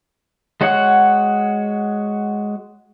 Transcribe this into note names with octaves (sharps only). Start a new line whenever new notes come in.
G#3 F#4 C#5 F#5